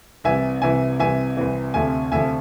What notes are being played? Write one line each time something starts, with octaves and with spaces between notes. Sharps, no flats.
C2 C3 E3 E5 G#5
C2 C3 E3 E5 G#5
C2 C3 E3 E5 G#5
C2 C3 E3
D2 C3 F3 E5 G#5
D2 C3 F3 E5 G#5